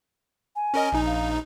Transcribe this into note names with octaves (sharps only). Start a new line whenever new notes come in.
G#5
C#4 A#4 D#5
A#1 D#4
F5